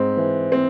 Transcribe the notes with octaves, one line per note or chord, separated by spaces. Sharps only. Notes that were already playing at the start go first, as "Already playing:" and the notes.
Already playing: G#2 C4
E3
C4